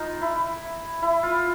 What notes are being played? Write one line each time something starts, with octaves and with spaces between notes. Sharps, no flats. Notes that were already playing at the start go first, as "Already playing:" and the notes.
Already playing: D#4 F4
E4
E4
F4